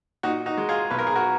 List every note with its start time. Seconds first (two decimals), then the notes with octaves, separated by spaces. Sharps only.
0.23 A#2 D#4 F#4
0.46 D#4 F#4
0.58 G#3
0.69 F4 G#4
0.91 B1 B4
0.99 A#4
1.07 G#4
1.16 F#4 A#4